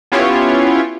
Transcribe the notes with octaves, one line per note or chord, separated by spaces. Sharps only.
B3 C#4 E4 F4 G4 C#5